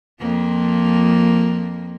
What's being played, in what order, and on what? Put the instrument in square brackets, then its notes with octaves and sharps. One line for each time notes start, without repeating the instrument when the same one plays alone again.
[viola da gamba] F2 F3 A#3